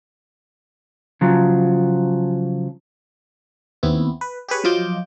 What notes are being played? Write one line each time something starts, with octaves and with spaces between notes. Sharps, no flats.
C#3 F3 F#3
D#2 B3 C4 E4
B4
G4 G#4 B4 C#5
F3 F#3 F4 D#5 D6 G6